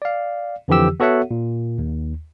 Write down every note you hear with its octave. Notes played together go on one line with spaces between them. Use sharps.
D5 F5
F2 D3 E3 F3 G4 E6
B3 F#4 A4 C#5 E5 F#5
A#2
D#2